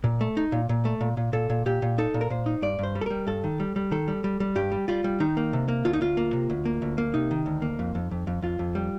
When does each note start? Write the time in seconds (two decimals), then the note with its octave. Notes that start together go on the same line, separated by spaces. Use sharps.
0.04 A#2
0.21 A3
0.37 D#4
0.52 A#2
0.69 A#2
0.85 A3
1.01 A#2
1.17 A#2
1.33 A#2 A4
1.50 A#2
1.66 A#2 G4
1.82 A#2
1.98 D#4 A4
2.14 A#2
2.21 A#4
2.30 A#2 C5
2.46 D#4
2.62 G2 D5
2.79 G2 C5
2.95 G3
3.01 A4
3.06 G3 A#4
3.27 G2 A4
3.44 D#3
3.60 G3
3.76 G3
3.91 D#3 A4
4.08 G3
4.24 G3
4.40 G3
4.55 G2 G4
4.72 G3
4.88 G3 F4
5.04 G3
5.20 D#3 D#4
5.37 A#3
5.53 C3
5.68 A#3
5.85 D2 F4
5.93 D#4
6.01 D2 F4
6.17 A#3
6.33 C3
6.50 D2
6.65 A#3
6.82 D2
6.98 A#3
7.14 C3 D#4
7.31 D#3
7.46 D2
7.62 A#3
7.79 F2
7.95 F2
8.11 F2
8.27 F2
8.42 F2 F4
8.59 F2
8.75 G3